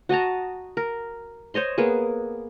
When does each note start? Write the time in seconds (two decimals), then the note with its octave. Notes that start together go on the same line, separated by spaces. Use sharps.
0.09 F#4 D#5 A5 A#5
0.77 A#4
1.54 C5 C#5 D#5 C6
1.78 A#3 B3 G#4